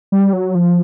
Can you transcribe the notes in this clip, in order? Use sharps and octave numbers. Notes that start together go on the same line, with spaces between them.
G3
F#3
F3